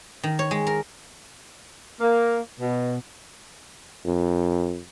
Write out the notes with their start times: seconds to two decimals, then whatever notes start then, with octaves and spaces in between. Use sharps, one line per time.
0.24 D#3
0.39 C#5
0.51 G#3
0.67 A#4
2.01 A#3
2.59 B2
4.06 F2